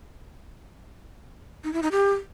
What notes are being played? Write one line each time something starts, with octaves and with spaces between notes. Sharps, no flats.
D#4
E4
D#4
G4